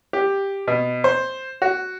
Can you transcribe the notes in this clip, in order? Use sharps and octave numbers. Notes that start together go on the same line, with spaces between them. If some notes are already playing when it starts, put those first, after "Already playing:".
G4
B2
C5
F#4